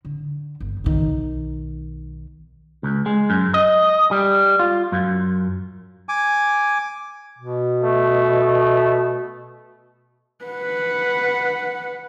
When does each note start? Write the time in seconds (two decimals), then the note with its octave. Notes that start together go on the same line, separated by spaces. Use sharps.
0.05 D3
0.60 G1
0.84 B1 D#3
2.83 C#2
3.06 G#3
3.30 F#2
3.54 D#5
4.11 G3
4.59 F4
4.92 F#2
6.09 G#5 D6
7.39 B2
7.83 A3
10.45 B4 F#5